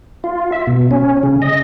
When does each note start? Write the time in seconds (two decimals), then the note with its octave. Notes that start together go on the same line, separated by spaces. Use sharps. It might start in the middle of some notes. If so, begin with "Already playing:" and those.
0.24 F4
0.52 E5
0.67 B2
0.91 C#4
1.23 C#3
1.42 D#5